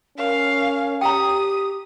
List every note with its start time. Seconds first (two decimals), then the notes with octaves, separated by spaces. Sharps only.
0.18 C#4 A#4 F5
1.01 G4 G5 A#5 D#6